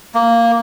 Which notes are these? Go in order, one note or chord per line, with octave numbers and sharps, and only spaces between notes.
A#3